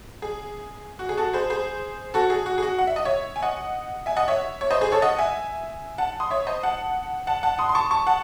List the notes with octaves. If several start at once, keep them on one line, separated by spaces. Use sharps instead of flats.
G#4
F#4
G#4
F#4 A4
G#4 C5
G#4 C5
F#4 A4
G#4
F#4
G#4
F#4
F#5
E5
D#5
C#5 E5
G#5
D#5 F#5
E5 G#5
D#5 F#5
C#5 E5
C#5
C5 D#5
G#4 C5
A4 C#5
D#5 F#5
E5 G#5
F#5 A5
C6 D#6
C#5 E5
C5 D#5
F#5 A5
F#5 A5
F#5 A5
C6 D#6
C6
A5 C#6
A5 C#6
F#5 A5